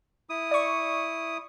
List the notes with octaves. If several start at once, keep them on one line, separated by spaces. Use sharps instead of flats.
E4 D#6
D5 C#6